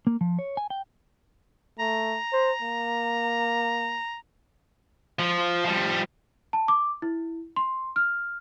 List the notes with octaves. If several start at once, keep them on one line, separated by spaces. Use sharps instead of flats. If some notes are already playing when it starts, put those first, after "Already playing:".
A#3
F3
C#5
G#5
G5
A3 A#5
C5
A#3
F3
F3 G3
A5
D6
E4
C6
F6